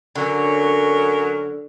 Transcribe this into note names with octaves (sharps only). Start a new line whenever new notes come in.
D3 F#3 C#4 A#4